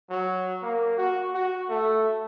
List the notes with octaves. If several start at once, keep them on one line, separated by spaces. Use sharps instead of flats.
F#3
A#3
F#4
F#4
A3